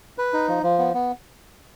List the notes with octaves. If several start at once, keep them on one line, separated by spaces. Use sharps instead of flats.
B4
D#4
F3
F3
B3
B3